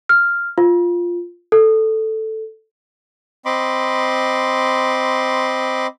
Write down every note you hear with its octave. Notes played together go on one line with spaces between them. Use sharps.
F6
F4
A4
C4 D#5 B5 C6 D6